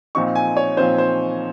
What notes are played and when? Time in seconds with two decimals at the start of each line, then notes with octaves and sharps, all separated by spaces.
0.15 A#2 F3 C4 D#4 C#6
0.36 G#5
0.57 C#5
0.77 A#2 F3 C4 D#4 C5
0.98 C5